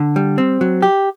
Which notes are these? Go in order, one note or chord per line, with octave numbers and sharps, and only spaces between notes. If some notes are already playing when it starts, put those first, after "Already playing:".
Already playing: D3
G3
C4
F#3
G4